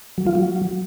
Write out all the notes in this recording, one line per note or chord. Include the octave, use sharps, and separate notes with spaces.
F#3
F4
F#3